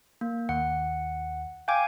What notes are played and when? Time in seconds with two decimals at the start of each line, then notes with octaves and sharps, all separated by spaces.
0.21 A#3
0.49 D#2 F#5
1.68 F5 G5 G#5 D6 G#6